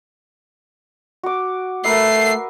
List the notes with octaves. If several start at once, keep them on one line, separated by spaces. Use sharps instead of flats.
F#4 D6
A3 A#4 B4 E5 C7